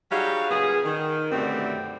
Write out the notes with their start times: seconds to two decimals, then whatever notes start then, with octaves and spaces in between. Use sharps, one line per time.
0.12 F#3 G3 D#4 F#4 G#4 F5
0.50 A#2 C#3 B3 G#4
0.84 D#3
1.31 F#2 B2 D3 G3 A3 C4